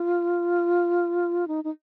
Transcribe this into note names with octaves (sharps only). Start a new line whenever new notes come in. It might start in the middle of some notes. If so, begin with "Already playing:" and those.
Already playing: F4
D#4
D#4